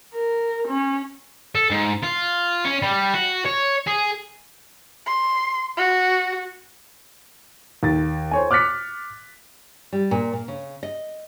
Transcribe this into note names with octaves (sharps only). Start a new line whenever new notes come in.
A#4
C#4
A4
G#2
F4
C#4
G3
F#4
C#5
G#4
C6
F#4
D#2 A6
C5 C#5 G#5
D6 F6 F#6 A6 B6 C#7
G3
A#2
A#3
C#3
D#5